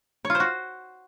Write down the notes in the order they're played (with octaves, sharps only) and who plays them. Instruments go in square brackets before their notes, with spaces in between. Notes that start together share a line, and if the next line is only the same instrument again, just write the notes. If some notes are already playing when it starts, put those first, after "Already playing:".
[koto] C#5
F4
C5
F#4